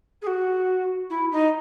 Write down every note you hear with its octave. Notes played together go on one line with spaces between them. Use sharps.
G#4
F#4
E4
D#4